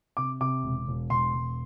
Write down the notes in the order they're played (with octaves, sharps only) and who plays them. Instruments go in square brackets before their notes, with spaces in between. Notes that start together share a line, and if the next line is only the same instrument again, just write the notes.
[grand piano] C3 D6
C3 D6
E1
E1
E1 C6
E1